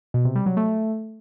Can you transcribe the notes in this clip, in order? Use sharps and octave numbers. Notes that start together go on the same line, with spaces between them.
B2
C3
G3
F#3
A3